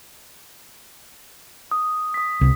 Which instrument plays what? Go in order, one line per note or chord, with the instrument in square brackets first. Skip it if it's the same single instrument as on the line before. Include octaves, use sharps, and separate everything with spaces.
[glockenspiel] D#6
D#6 B6
[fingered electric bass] C2